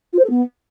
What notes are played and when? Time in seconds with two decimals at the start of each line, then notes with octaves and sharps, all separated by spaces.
0.13 F4
0.19 C5
0.24 A4
0.30 B3